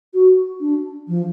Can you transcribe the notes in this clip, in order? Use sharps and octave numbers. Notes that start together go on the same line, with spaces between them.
F#4
D4
F3